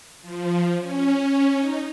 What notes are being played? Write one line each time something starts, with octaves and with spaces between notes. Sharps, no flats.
F3
C#4
D#4